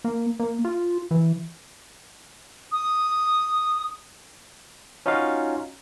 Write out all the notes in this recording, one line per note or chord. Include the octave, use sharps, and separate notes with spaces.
A#3
A#3
F4
E3
D#6
C#4 D#4 F4 F#4 F5